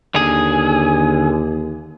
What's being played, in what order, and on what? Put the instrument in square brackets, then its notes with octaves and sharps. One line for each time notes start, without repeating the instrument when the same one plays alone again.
[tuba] D#2 [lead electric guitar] D3 G#4